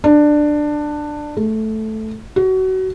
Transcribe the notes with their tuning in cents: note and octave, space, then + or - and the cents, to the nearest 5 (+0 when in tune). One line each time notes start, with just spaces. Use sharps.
D4 +15
A3 -5
F#4 +25